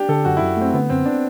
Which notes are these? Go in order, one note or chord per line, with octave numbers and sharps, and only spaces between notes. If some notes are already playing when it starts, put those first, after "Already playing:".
Already playing: D4 G4
D3 A4
F#2 F#4
F#2 E4
A3 C4
D3 B3
F#2 C4
D4